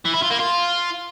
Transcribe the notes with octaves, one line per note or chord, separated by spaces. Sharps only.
E3
E4
F4
A#3
F4